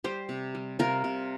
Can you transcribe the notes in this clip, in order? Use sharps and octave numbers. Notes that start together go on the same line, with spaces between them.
G3 G4 C5
C3
G3
C3 F4 A#4
C3